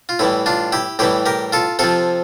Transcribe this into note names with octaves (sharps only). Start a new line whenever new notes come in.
F4
A2 E3 G3 E4
D4 F4
E4 G4
A2 E3 G3 E4 G4
G4 A#4
F4 A4
C3 F3 F4 A4